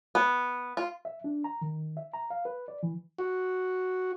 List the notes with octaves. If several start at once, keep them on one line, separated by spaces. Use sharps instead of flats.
B3
F4
E5
D4
A#5
D#3
E5
A#5
F5
B4
D5
E3
F#4